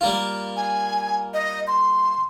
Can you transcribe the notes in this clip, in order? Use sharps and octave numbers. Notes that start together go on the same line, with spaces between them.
G3 A#3 F4
G#5
D#5
C6